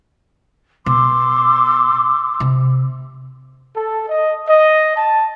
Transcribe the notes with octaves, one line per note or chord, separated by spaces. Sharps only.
B2 C6 D6 E6
C3
A4
D#5
D#5
A5